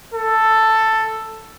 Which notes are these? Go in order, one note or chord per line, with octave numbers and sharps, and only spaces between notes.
A4